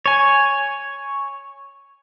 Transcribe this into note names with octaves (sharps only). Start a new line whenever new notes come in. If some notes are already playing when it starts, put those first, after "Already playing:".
C#5 G#5